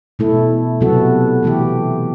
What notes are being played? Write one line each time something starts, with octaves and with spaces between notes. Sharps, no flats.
B2 A3 E4 A4
C3 F#3 B3 F#4 A4
E3 A3 E4 G4